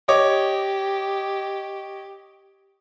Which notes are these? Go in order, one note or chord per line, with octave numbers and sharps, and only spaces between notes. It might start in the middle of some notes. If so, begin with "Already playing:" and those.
G4 C#5 D#5 D6